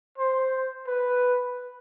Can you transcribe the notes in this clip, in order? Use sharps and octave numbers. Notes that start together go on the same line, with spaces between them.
C5
B4